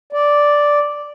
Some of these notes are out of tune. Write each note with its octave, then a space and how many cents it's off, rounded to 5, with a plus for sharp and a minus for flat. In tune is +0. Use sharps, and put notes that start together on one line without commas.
D5 -5